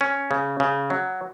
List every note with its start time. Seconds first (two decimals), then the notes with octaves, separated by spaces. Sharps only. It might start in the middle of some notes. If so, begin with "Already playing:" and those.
0.01 C#4
0.31 C#3
0.60 C#3
0.90 F#3